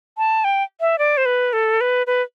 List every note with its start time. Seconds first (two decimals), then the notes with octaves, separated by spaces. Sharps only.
0.18 A5
0.44 G5
0.81 E5
0.99 D5
1.17 C5
1.26 B4
1.53 A4
1.81 B4
2.07 B4